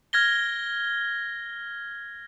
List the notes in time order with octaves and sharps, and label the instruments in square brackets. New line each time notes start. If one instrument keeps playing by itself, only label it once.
[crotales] F6 G#6 A#6 G7